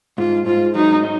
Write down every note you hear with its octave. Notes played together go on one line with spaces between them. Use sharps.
G#2 F4
G#2 F4
F#3 D#4
D#4